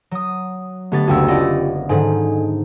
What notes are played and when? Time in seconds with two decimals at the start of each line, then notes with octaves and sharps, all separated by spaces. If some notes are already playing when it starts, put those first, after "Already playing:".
0.11 F#3 D#6
0.92 D3 A3 B3 G4 A6
1.08 F#1 D2 F#4 G5 E6
1.28 C#4 F4 G4 D5 D#5
1.89 G#2 D3 D#3 A4 G#5